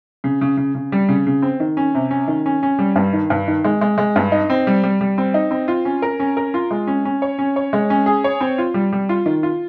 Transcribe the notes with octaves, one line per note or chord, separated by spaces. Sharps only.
C#3
C#3
C#3
C#3
G3
C#3
C#3
C4
D#3
C#4
C3
C#4
D#3
C#4
C#4
G3
G2
D#3
G2
D#3
G#3
G#3
G#3
G2
D#4
C4
G3
G3
G3
C4
D#4
C4
F4
C#4
A#4
C#4
A#4
F4
G#3
C#4
C#4
C#5
C#4
C#5
G#3
C#4
G#4
C#5
C4
F4
G3
G3
F4
D#3
F4